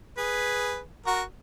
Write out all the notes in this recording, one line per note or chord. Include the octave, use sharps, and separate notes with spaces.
G#4 B4
F#4 A#4